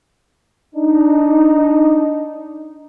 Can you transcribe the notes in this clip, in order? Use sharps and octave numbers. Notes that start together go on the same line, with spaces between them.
D4 D#4